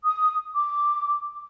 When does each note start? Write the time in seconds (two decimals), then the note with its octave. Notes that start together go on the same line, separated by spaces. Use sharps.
0.04 D#6
0.54 D6